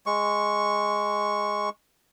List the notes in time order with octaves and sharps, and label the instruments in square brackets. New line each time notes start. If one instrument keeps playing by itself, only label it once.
[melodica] G#3 C#6